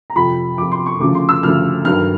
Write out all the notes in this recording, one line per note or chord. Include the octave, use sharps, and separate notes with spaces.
A#5
F2 C3 F3 B5
F2 C3 F3 D6
C6
C#6
D2 C#3 F3 D6
C6
E6
D2 C#3 F3 F6
G2 D#3 F#3 F6